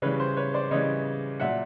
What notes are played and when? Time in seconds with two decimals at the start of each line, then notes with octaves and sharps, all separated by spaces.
0.02 C#3 E3 G3 B4 C#5
0.19 C5
0.37 B4 C#5
0.54 C5 D5
0.71 C#3 E3 G3 C#5 D#5
1.40 A#2 F#3 E5 F#5